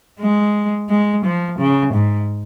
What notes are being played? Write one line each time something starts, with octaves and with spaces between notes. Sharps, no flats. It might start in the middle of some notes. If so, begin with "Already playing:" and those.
G#3
G#3
F3
C#3
G#2